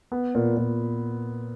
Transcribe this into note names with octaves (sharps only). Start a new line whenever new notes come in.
B3
A#2
A#2